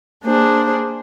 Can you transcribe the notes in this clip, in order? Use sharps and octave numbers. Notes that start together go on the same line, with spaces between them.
A#3 D4 G#4 C5